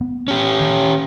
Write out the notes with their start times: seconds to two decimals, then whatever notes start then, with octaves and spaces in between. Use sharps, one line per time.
0.01 B3
0.28 C#4 G4
0.60 D#3